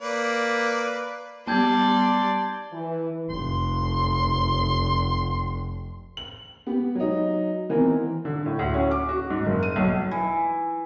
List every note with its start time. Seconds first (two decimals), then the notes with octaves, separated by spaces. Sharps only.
0.01 A#3 B4 D5
1.47 G3 B3 D5 A5 C6 G6 G#6
2.72 E3
3.30 F1 C6
6.17 F#7
6.67 B3 G4
6.95 F#3 D#4
7.69 D#3 E3 B3 C4 A#4
8.25 D3
8.46 A2
8.59 D2
8.74 C#4
8.91 D6
9.09 F#4
9.30 G#2
9.46 F#1
9.63 D#7
9.76 B1
10.11 E3